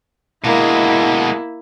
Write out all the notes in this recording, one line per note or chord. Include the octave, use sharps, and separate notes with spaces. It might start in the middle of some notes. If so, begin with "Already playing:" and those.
B2 G#3 A#3 E4